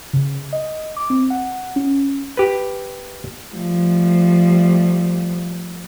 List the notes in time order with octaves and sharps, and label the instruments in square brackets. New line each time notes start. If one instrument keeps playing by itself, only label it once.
[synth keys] C#3
D#5
D6
C4
F#5
C#4
[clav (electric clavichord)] G4 B4
[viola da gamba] F3 G3 A3